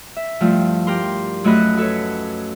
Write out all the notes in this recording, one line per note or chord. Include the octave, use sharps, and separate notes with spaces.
E5
G2 F3 A3 E4 F4
G4 A#4 C6
F#2 A3 F#4 D#5 B5 F#6
F#4 A4 B4 C#5